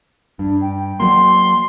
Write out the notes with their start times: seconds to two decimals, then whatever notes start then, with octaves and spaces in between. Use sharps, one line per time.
0.39 G2 D4
0.61 G5
1.00 F#3 A#3 C6